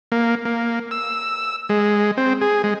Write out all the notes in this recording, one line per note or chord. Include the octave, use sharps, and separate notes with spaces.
A#3
A#3
E6
G#3
C4
G#4
G#3